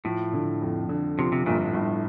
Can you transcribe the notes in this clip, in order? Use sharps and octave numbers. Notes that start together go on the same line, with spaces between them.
A2 F3
D3
F2
D3
C3 F3
C3
G1 A#2
A2
G1